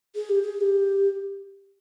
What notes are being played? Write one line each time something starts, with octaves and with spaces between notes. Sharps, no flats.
G#4
G4
G#4
G4